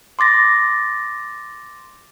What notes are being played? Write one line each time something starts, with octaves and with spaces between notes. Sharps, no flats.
C6 D6 A6 A#6